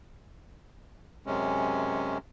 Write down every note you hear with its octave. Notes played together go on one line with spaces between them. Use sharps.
F#2 C3 G#3 C#4